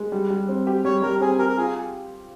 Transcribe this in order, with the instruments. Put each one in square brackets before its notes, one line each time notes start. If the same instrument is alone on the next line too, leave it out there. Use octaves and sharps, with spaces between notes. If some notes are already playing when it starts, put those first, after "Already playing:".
Already playing: [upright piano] G#3
G3
G3
C4
G4
[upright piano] G3 [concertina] C#5
[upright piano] G3 [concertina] A#4
[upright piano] C4 [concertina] G#4
[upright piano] G4 [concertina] A#4
[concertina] A#4
[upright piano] F4 [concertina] G#4